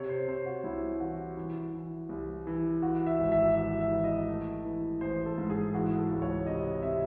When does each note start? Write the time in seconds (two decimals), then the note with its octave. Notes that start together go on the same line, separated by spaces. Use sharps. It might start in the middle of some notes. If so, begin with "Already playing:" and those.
Already playing: C3 C#5
0.09 C5
0.28 C3 C5
0.46 F#4
0.64 C2 E4
1.00 E3 F#4
1.37 E3
1.74 E3
2.09 C2
2.47 E3
2.82 E3 F#4
3.06 E5
3.19 G#1
3.32 E5
3.55 E3 E5
3.80 E5
3.91 E3
4.04 D#5
4.29 A3
4.65 E3
5.01 A1 C5
5.26 A4
5.38 G#2
5.50 G#4
5.73 E3 F#4
5.98 A4
6.11 C#2
6.22 C#5
6.46 C3 D#5
6.83 C3 E5